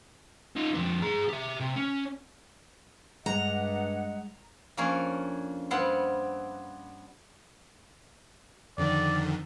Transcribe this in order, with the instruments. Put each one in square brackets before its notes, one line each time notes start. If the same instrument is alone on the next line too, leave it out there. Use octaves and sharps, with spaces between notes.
[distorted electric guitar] D#4 F4
F2 D4
G#4 A#5
G4 E5
C3
C#4
[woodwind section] G2 F#5 [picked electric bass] G3 G#3 [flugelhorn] D#5 [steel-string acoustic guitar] A#5
[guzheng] F2 A#3 C#4 D4 C#5 F5
G2 B3 C4 F5 F#5
[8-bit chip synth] F2 D3 D#3 [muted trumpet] D5